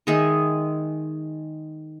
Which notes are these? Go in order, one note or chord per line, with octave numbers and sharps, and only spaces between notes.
D#3 G#3 G#4 E5